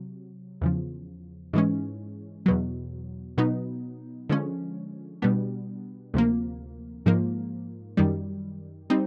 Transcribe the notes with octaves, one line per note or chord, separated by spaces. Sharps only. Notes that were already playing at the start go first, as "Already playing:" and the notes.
Already playing: C3 F#3
E2 C#3 F3
G#2 E3 G#3 C#4
E2 B2 F#3
B2 F#3 B3 D#4
D3 F3 G#3 C#4
B2 G3 B3 D4
D2 C3 F3 A#3
G#2 F3 A#3
F#2 D#3 G3
G3 C4 D#4